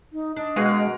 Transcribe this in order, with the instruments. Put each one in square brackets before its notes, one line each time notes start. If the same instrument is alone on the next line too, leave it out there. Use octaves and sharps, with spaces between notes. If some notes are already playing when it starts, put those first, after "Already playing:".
[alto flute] D#4
[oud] D4 [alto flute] D#5
[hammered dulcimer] B2 F#4 [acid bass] G#3 [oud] G#4 F5
[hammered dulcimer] A#4